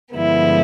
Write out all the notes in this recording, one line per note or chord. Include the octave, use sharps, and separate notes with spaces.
G2 D3 F3 G#3 B3 E4